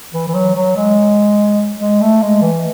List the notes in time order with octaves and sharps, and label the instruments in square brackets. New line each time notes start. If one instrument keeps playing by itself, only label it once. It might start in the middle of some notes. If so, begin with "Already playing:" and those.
[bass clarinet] E3
E3
F#3
F#3
G#3
G#3
A3
G#3
E3